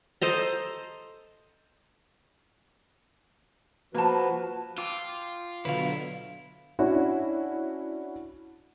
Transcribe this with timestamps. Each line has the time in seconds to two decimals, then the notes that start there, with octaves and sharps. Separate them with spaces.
0.22 A4 C5 D#5 A#5
3.94 F3 A#3 F#4 B4 A5
4.78 F4 G5 D6 E6
5.65 B2 D3 F#3 E4 B4 F5
6.79 C#4 D4 E4 F#4